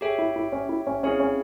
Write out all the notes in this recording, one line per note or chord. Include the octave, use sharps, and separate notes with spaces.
G4 G#4 C#5 E5 G5
E4
E4
C#4
E4
C#4
C4 C#4 E4 G#4 C#5 F5
C#4